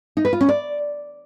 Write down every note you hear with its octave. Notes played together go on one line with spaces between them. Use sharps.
D#4
B4
F4
C#4
D5